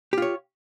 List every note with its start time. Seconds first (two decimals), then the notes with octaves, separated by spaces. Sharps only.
0.13 G4
0.18 F4
0.22 C#5